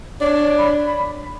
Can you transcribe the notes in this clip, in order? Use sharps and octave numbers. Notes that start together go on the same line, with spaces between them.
D4 C#5
B5